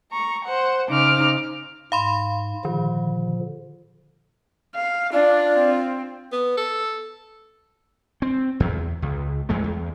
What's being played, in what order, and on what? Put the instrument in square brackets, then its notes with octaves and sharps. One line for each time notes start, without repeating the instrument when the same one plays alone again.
[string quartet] A#5 C#6
C5 F#5
C#3 D#4 C5 D6 F6
[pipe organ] G#2 [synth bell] F5 B5 C6
[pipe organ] A#2 D3 F3 [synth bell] D#3
[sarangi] F5
[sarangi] D4 [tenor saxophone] F4 [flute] D5
[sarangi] C4
[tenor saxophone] B3
A4
[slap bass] C4
E2
C#2
E2 G#3 A3
E2